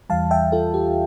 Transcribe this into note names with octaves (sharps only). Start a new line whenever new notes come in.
E2 E3 G3 F5 A5
E5 G5
F4 A4
G4